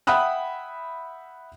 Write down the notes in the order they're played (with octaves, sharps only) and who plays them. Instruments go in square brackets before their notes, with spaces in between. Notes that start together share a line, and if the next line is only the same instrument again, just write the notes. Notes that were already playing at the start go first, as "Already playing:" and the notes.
[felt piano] E5 F#5 G5 B5 D#6 F#6